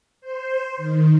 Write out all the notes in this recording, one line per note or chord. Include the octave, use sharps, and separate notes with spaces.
C5
D#3